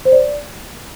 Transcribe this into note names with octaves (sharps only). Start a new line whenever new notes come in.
C5
D5